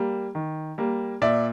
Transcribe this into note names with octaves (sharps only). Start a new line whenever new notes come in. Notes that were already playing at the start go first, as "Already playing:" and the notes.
Already playing: G3 A#3
D#3
G3 A#3
A#2 D5 E5